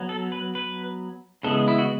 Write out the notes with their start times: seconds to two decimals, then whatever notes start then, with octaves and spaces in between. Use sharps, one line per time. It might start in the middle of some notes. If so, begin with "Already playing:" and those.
Already playing: F#3 B3
0.09 A4
0.32 B4
0.55 B4
1.43 C#3 E3 G#3 B3 A4
1.68 E4
1.78 F#4